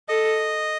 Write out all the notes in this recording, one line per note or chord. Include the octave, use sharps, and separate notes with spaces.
A4 D#5